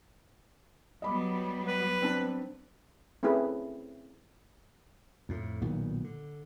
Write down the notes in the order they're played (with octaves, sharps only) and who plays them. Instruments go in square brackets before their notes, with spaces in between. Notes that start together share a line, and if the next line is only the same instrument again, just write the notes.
[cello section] F#3 G3 B3 [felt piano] D#5 B5 D6
[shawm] B4
[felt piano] C4 D4
[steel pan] A3 C4 C#4 E4 G#4 B4
[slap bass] F2 A2
B1 A#2 D#3 B3
D3